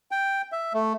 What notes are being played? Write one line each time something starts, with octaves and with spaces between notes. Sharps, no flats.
G5
E5
A3